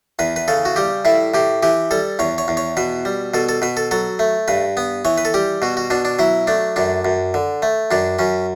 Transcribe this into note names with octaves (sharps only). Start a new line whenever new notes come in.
E2 B4
B4
C#3 A4
F#4
G3 G4
A2 E4
A2 G4
E3 G4
G3 A4
E2 C#5
C#5
E2
C#5
B2 B4
G3
B2 A4
A4
B2 B4
A4
F#3 A4
A3
G2 B4
B3
E3 C#5
B4
A4
G3 G4
B2 F#4
F#4
B2 D4
D4
F#3 E4
A3 D4
F#2 D4
F#2
D3
A3
F#2 D4
F#2 C#4